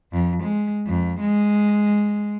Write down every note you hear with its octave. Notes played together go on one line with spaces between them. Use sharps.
F2
G#3
F2
G#3